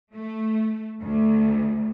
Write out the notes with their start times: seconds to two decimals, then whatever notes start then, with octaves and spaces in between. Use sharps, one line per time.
0.13 A3
1.01 D2